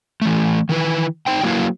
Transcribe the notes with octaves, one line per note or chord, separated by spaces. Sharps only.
E3 A3
D#3 E3 B4
D#4 C5 G5
F#3 A#3 E4 B4 F5